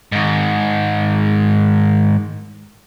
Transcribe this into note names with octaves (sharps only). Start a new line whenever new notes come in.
G#2 D#3